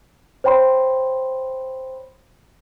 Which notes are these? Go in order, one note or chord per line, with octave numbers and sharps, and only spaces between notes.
C5 C#5 G5 B5 C6